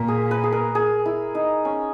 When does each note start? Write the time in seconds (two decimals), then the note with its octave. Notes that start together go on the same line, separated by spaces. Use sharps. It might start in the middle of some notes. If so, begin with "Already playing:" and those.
Already playing: A#2 A#4
0.08 G#4
0.31 B4
0.44 G#4
0.52 A#4
0.75 G#4
1.06 E4
1.35 D#4
1.65 C#4